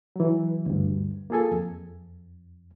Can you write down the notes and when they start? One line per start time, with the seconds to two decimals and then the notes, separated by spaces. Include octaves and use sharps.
0.16 E3 F#3
0.66 D2 G2
1.30 A#3 F4 G#4 A4 G#5
1.51 F2